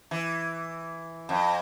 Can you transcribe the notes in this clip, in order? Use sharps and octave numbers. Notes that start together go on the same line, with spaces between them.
E3
F2